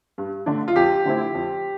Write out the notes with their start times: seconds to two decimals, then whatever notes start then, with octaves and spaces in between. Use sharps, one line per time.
0.18 G2
0.46 D3 A3 D4
0.68 F4
0.76 F2 G4
1.05 D3 A3 C4 E4
1.34 F2